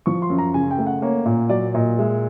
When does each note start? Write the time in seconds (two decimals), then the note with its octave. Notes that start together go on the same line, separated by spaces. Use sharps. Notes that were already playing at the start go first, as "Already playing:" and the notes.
0.06 F3 C#6
0.22 C6
0.30 F#2
0.38 A#5
0.54 C#3 G#5
0.71 G5
0.78 A3
0.87 F#5
1.02 A#3 C#5
1.26 A#2
1.49 F#3 D5
1.74 A#2 D#5
1.98 G#3 E5